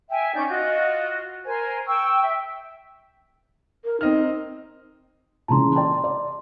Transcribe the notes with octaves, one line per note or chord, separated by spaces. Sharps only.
E5 G5 G#5
C#4 D#4 D5 G6
F4 F#4 D#5
A#4 C5 G#5
G5 C#6 E6
E5 G5
A#4
C4 D#4 D#5 F6
A#2 C#3 E3 A5 A#5 C6
D5 G5 A5 C6
D5